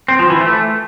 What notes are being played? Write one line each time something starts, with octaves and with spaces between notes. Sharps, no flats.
C4
F3
E3
A3